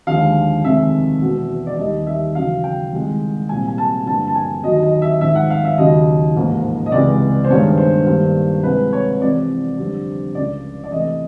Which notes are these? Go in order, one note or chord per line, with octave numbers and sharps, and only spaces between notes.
D#2 D3 F3 G#3 F5
F2 C3 D#3 G#3 E5
E1 E2 B2
D5
D#2 D#3 G3 D#5
E5
E2 C#3 F#3 F5
G5
C2 C3 D#3 G#3
C2 A#2 G3 C4 G#5
G#5
A5
G2 D3 F3 A#3 A5
A5
G#5
D#2 D#3 F#3 D#5
D#5
E5
G#1 G#2 F3 E5
F#5
F5
E5
D#2 C#3 F#3 D#5
A1 G#2 F3 A#3
D#5
C#2 C3 E3 G#3 D5
C5
G2 D#3 G#3 B3 C#5
C5
G2 D#3 G3 A#3
C2 C3 F3 G#3 B4
C#5
E2 C3 F3 G#3 C4 D5
F2 D3 G3 C4
C#2 C#3 F3 D5
D5
E2 C3 E3 A3 D#5